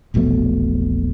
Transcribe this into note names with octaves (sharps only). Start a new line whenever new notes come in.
E1 A#1 B2 A3